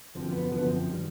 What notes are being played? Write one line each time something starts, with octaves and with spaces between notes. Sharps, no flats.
F#2 D3 F3 C4
B3
F#2 D3 F3 B3
C4
D#3 G3